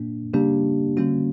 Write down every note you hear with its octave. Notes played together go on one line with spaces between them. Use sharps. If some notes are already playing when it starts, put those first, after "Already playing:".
Already playing: A#2 A#3 D4
C#3 G3 A#3 D4 G4
D3 G3 A#3 C#4 F#4